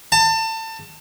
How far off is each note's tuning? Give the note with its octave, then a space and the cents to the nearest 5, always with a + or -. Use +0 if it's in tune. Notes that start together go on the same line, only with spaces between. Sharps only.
A5 +30